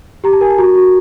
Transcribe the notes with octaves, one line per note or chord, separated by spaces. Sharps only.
G4 A#5
A5
A#4 G#5
A5
F#4 A#5
F#4